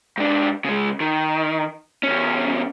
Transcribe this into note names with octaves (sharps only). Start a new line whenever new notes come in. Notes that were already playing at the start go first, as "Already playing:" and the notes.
G#2 D4
C#3 G#3
D#3
E2 C#4